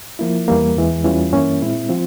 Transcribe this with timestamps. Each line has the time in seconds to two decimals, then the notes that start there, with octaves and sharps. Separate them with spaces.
0.19 F3 A#3 E4
0.48 E2 E3 G3 A#3
0.76 E2 E3 G#3
1.04 E2 E3 G3 C#4 F4
1.33 G2 E3 A#3 C#4 E4
1.61 A#2 G#3 C4 E4
1.89 F3 C4 F4